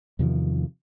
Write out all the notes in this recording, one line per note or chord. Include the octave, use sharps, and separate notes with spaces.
E2 C3 D#3 F3